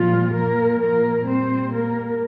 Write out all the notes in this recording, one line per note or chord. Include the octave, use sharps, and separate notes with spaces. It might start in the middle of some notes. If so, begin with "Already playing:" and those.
Already playing: A#2 F3 G3 F4
A#2 F3 A#3 A#4
A#3 A#4
A#2 G3 C4 C5
A#3 A#4